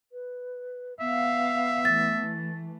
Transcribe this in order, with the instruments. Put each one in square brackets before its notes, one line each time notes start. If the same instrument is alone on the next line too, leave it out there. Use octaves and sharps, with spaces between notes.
[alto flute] B4
[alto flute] B3 [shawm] E5 [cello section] F5
[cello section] E3 A3 [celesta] A6